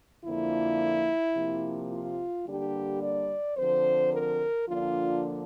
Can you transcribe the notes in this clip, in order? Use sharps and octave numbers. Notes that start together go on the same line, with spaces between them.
F2 D3 F3 A#3 E4
C3 F3 A#3
F4
D3 G3 A#3 D4 G4
D5
D3 F3 C4 C5
A#4
D3 F3 A#3 D4 F4